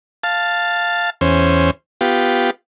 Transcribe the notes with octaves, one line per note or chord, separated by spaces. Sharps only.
F5 A5
E2 C#4 C5
B3 F4 G4